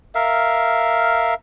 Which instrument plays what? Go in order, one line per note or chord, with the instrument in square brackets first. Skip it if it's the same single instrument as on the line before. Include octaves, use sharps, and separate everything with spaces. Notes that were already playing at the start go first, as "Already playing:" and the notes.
[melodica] A#4 E5 F5